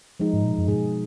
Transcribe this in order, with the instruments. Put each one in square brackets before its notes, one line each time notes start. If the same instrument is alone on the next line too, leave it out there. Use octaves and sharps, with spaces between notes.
[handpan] F3 G#3 D#4 G#4
[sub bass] G#2
A#2
F#2
[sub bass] G#2 [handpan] B2 G#3 D#4 G#4